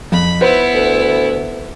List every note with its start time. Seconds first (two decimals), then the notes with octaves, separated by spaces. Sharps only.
0.12 F2 B5
0.41 B3 E4 B4 C5
0.74 D2